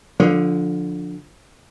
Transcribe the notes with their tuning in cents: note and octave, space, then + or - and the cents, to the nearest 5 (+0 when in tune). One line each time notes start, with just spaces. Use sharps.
D3 +0 F3 +20